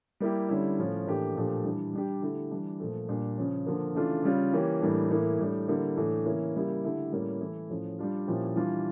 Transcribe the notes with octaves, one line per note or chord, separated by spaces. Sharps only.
G3 A#3 E4 G4
D3 G3 C#4 E4
A2 F3 C#4 F4
A2 E3 A#3 D4 G4
A#2 F3 A3 D4 G4
E3 G3 D4
G3 D4 G4
D3 A3 E4 G4
E3 G3 D4
A#2 F3 A3
A#2 G3 D4
C#3 F3 C#4
D3 F3 A#3
C#3 E3 A3 D4 F4
C#3 G3 C#4 F4
E3 A#3 C#4 G4
A2 E3 G3 A#3 D4
A2 E3 A#3 E4
A2 G3 D4
D3 G3 A#3 E4
A2 E3 A3 D4
C#3 E3 A#3 C#4 E4
C#3 G3 A#3 E4 G4
D3 A3 E4 G4
A2 G3 A#3 C#4 E4
E3 A3 E4
A2 F3 C#4
G3 D4 F4
A#2 F3 C#4 E4 G4
E3 G3 D4 F4